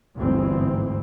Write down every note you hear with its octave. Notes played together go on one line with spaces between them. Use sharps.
G1 D2 G#2 E3 C4